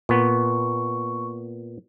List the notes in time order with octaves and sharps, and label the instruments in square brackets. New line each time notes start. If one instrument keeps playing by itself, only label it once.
[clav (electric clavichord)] A#2 B3 [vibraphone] C#6